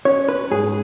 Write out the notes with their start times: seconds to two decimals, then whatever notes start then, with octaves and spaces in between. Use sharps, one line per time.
0.05 C#4 C#5
0.29 B4
0.51 G#2 G#4